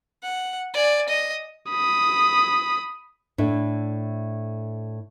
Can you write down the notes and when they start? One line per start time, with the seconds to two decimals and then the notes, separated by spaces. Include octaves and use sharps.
0.23 F#5
0.74 D5 G#5
1.08 D#5
1.71 B5 D#6
3.38 A2 A3 D4 E4